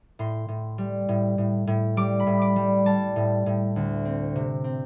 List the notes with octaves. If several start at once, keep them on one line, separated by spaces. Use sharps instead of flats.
A2 C6
A2
G3
A2
A2
A2
G3 D6
B5
A2
D6
G3
G3 A5
A2
A2
D2
C4
C3
C4